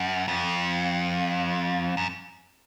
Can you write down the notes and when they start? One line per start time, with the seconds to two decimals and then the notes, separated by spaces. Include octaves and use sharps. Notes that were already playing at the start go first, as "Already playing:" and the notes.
Already playing: F#2
0.28 F2
1.97 F#2